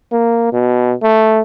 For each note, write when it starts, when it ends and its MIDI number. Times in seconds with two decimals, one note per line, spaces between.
0.12 0.49 58
0.53 0.93 47
1.03 1.41 57